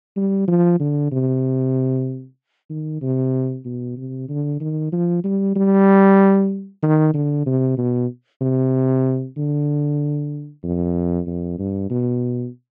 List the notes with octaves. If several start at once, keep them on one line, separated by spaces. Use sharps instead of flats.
G3
F3
D3
C3
D#3
C3
B2
C3
D3
D#3
F3
G3
G3
D#3
D3
C3
B2
C3
D3
F2
F2
G2
B2